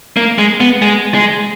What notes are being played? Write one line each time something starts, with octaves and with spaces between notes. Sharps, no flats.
A#3
G#3
B3
G#3
G#3